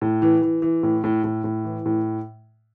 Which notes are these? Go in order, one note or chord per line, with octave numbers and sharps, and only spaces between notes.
A2
E3
E3
E3
A2
A2
A2
A2
E3
A2